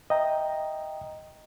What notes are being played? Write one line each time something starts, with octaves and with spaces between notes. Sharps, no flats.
D#5 E5 G5 A#5